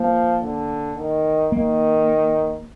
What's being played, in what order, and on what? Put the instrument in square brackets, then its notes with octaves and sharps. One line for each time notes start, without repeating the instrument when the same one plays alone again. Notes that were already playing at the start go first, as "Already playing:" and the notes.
Already playing: [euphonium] F3 [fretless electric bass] A#3
[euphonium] D3
D#3
[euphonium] D#3 [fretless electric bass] A#3